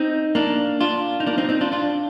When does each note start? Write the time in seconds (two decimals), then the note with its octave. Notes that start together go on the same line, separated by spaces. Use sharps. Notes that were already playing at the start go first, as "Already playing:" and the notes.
Already playing: C4 D#4
0.35 A#3 D4
0.81 D4 F4
1.20 D#4
1.27 A#3 D4
1.38 C4 D#4
1.49 C4 D#4
1.61 D4 F4
1.72 D4 F4